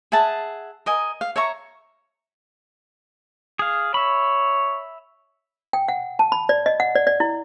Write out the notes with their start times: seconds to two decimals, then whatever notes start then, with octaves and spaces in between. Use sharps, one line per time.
0.12 G#4 E5 F#5 A5
0.86 A#4 D#5 G#5
1.21 F5
1.36 C#5 E5 A#5 C#6
3.59 G#4 F5
3.94 C#5 E5 B5
5.73 G5
5.88 F#5
6.19 A5
6.32 B5
6.49 D5
6.66 D#5
6.80 F#5
6.95 D5
7.07 D5
7.20 E4